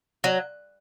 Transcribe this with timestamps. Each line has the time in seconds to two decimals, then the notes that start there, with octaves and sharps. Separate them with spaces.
0.24 F#3